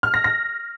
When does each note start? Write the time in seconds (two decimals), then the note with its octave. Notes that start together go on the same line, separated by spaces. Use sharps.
0.03 F6
0.14 A#6
0.24 A#6